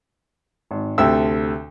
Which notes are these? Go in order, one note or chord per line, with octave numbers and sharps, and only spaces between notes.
G#1
D2 C3 A4 E5 G5 E6